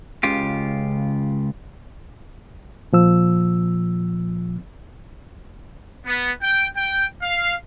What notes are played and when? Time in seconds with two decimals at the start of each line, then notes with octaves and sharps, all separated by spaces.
0.23 C#2 C#3 F4 G4
2.93 A#2 F3 E6
6.06 B3
6.42 G5
6.77 G5
7.22 F5